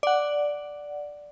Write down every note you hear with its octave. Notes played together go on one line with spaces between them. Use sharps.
D5 F#5